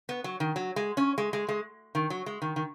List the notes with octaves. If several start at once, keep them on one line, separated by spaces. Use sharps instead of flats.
B3
F#3
D#3
F#3
G#3
C#4
G#3
G#3
G#3
D#3
F#3
G#3
D#3
D#3